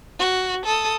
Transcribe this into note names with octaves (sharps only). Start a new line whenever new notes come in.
F#4
A4 D#6